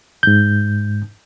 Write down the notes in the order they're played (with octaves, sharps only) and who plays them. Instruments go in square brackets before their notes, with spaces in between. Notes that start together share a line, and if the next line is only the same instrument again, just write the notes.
[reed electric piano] G#2 G6